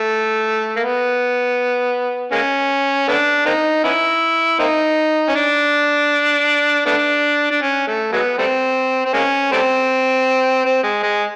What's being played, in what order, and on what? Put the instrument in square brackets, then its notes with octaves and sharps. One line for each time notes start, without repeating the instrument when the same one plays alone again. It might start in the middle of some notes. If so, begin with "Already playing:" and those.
Already playing: [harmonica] A3
A#3
B3
G#3 A#3 C#4
A3 B3 D4
A#3 C4 D#4
B3 C#4 E4
A#3 C4 D#4
C#4
D4
A3 B3 D4
D4
C#4
A3
F#3 G#3 B3
G3 A3 C4
C4
G#3 A#3 C#4
G3 A3 C4
C4
G#3
G#3